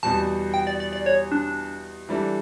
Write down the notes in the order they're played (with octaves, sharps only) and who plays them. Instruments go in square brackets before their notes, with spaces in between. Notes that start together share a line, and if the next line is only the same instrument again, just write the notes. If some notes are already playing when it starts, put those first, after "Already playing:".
[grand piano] E2 B2 G3 B3 [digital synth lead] A5
[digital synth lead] G5
D5
D5
D5
C#5
D4
[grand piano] E3 G3 D4 A4